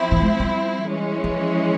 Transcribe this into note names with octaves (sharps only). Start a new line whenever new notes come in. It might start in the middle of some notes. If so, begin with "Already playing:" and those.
Already playing: F3 C4 E4
E3
G#3
G3
E3 G#3 C#4
F3